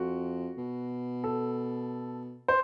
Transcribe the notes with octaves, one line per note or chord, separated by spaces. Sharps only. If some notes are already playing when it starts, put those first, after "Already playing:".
Already playing: F2 F#4
B2
A4
C5